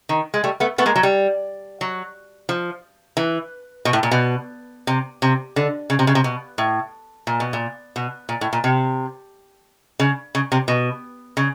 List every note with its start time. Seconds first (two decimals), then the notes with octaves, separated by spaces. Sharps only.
0.09 D#3
0.34 G#3
0.44 G3 A3
0.60 A3 B3
0.78 A3 B3
0.86 G#3 A#3
0.96 F#3
1.03 G3
1.81 F#3
2.49 F3
3.17 E3
3.85 B2
3.93 A2
4.03 A#2
4.12 B2
4.87 C3
5.22 C3
5.56 D3
5.90 C#3
5.99 C3
6.07 C#3
6.15 C3
6.24 B2
6.58 A2
7.27 A#2
7.40 B2
7.53 A#2
7.96 B2
8.29 A#2
8.41 A2
8.53 A#2
8.64 C3
10.00 C#3
10.35 C#3
10.52 C3
10.68 B2
11.37 C#3